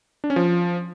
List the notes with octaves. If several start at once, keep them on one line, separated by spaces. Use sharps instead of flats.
D4
C#4
F3